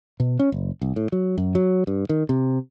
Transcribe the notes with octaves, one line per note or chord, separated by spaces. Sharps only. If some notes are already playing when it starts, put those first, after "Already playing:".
B2
C#4
F#1
C2
A2
F#3
F#2
F#3
G2
D#3
C3